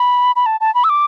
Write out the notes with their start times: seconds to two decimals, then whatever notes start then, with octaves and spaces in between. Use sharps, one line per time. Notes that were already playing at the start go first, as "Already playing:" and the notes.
Already playing: B5
0.36 B5
0.46 A5
0.60 A5
0.75 B5
0.84 E6
0.89 D6